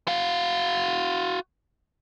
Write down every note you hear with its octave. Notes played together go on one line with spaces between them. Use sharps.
F#4 F5